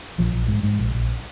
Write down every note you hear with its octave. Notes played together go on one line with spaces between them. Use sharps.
A#1 F3
A#1
G#2
G#2
A#1
A#1